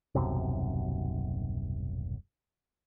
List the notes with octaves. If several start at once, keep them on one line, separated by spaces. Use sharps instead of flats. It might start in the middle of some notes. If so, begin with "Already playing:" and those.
D#1 B1 F#2 C3